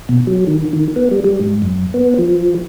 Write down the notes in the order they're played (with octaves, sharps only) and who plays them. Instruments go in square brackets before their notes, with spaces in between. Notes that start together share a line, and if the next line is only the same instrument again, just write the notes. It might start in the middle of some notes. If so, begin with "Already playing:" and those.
[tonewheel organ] B2
F#3
D#3
D#3
B3
G3
G3
G#2
F#2
B3
F3